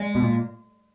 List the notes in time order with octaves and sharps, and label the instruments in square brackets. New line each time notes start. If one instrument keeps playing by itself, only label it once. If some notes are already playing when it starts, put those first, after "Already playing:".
Already playing: [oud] G#3
[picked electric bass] B2
A#2